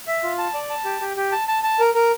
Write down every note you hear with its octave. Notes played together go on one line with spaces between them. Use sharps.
E5
F4
A5
D5
A5
G4
G4
G4
A5
A5
A5
A#4
A#4